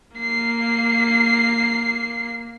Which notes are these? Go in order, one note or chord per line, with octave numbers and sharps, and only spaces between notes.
A#3 C7